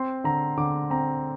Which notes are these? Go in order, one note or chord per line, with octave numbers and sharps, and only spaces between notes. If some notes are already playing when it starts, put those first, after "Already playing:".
Already playing: C4 C6
D3 A#5
D3 D6
C4 A#5